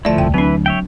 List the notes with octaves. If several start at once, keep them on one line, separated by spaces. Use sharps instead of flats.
D2 F3 A3 E4 D5 A5
F1 C2 G5
E3 F#3 C4 D4 B4
C#5 E5 G5